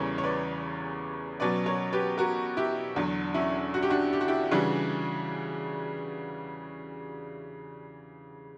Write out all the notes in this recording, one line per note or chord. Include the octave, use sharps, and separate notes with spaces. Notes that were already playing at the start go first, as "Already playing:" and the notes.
Already playing: E2 C#3 E3 G3 C#4 A#4 C#5
C#5
B4 D5
B2 F#3 C#4 B4 D5
A#4 C#5
G4 B4
F#4 A#4
E4 G4
E2 D3 F#3
C#4 E4
F#4
G4
D4 F#4
G4
F#4
E4 G4
C#3 E3 G3 D4 F#4